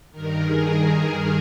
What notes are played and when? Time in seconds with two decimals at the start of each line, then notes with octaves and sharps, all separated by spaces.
0.12 G2 D#3 A#4
0.41 G#4